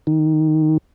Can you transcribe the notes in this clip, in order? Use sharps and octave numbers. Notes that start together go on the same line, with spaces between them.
D#3